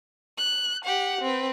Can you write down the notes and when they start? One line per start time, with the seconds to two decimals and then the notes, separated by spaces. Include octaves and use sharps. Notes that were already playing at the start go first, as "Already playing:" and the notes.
0.38 F#6
0.85 G4 F#5
1.21 C4 B4